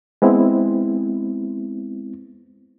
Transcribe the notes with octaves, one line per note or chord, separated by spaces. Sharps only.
G#3 B3 C4 E4